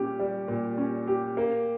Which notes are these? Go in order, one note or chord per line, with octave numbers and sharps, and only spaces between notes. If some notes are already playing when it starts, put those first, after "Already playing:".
Already playing: A#2 G3 C#4 G4
G3
A#2
C#4
G4
A#3